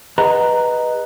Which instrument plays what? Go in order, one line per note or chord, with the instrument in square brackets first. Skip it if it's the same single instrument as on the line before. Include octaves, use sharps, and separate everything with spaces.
[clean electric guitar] G#4 B4 D#5 F#5 A#5